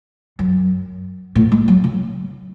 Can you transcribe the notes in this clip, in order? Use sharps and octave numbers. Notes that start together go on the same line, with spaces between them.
F#2
A2
G#3
F#3
C#3